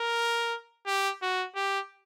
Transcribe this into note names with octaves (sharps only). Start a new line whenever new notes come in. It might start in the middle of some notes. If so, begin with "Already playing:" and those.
Already playing: A#4
G4
F#4
G4